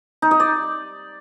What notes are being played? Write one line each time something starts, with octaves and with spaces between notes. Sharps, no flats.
D#4
D#5
D5